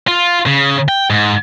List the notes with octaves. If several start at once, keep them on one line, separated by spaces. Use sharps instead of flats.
F4
C#3
G5
G#2